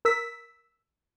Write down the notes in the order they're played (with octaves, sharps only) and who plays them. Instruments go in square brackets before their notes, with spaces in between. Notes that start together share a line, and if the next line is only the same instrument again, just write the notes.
[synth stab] A#4 E6 B6